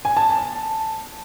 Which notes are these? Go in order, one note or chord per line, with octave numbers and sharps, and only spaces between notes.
G#5
A5